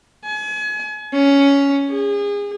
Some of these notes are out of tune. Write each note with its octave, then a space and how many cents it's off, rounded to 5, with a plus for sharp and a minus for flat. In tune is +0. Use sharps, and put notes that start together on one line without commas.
G#5 +35
C#4 +10
G#4 -30